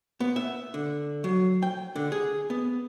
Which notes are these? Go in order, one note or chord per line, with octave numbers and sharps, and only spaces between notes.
B3
E5
D3
F#3
G5
D3
G#4
B3